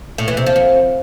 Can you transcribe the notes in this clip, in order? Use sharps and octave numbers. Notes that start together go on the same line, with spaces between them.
A2
E3
C3
F3
F2